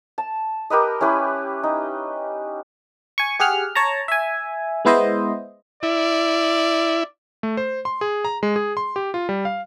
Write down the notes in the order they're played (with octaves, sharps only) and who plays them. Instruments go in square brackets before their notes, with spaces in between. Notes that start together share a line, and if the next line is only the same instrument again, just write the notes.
[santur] A5
G4 A#4 B4 D#5
C#4 E4 G4 B4
D#4
[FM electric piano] G#5 C#6
G4 G#4 F#5 F6
C#5 A5 A#5
E5 G#5
G#3 B3 E4 C5 D#5
[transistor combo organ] E4 [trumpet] D5
[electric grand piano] A3
C5
C6
G#4
A#5
G#3
G#4
C6
G4
F4
G3
F5